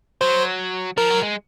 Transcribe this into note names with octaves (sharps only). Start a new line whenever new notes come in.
F#3 C5
F3 A#4
F#3
G#3